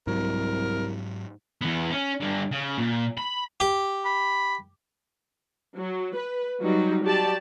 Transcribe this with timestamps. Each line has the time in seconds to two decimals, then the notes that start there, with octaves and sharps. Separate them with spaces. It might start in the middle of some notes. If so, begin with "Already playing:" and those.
0.07 C2 G#2 F#3 A#4
1.62 E2 B3
1.91 C#4
2.20 G2 D3
2.51 C#3
2.78 A#2
3.18 B5
3.60 G4
4.05 B5
5.77 F#3
6.16 B4
6.62 F#3 G3 D#4
7.04 F#3 G4 D5 A5